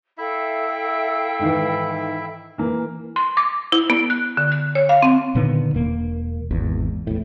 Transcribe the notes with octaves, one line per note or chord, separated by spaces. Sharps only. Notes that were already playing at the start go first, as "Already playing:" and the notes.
E4 A4 E5 F5 G5
G#2 D#3 E3
E3 A#3
C6
D6
E4
B3
F#6
D3
F#6
C#5
F5
C4
A#2 D3 D#3 B3
E1 A#3
G#1 E2
E2 A2